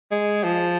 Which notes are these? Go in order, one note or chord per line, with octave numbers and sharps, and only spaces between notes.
G#3
F3